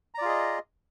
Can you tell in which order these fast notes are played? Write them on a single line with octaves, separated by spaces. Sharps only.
A#5 D5 F4 G#4 D#5